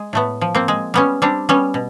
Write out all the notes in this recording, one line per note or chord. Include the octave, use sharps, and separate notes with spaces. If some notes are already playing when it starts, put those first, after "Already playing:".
Already playing: G#3
A2 A3 B3
F3
A#3 C4
G#3
G3 B3 C#4
G3 C4 D4
G3 B3 C#4
B2